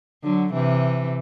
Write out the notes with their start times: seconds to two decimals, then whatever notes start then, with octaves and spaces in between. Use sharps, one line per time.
0.23 D3 F#3
0.53 C3 E3